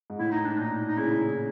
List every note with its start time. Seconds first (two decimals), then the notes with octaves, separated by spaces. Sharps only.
0.10 G#2
0.19 A2 E4
0.32 D#4
0.45 D4
0.58 A#2 D#4
0.88 D#4
0.97 C#3 E4